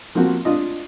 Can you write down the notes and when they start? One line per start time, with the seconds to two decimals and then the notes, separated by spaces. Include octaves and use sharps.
0.15 F3 A#3 C4 F#4
0.45 D4 F4 D#5